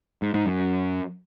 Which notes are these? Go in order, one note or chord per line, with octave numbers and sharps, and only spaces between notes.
G#2
G#2
F#2